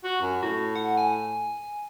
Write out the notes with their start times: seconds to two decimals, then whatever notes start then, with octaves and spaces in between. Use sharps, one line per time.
0.04 F#4
0.21 F#2
0.43 A2 F#4
0.75 F#5
0.97 G#5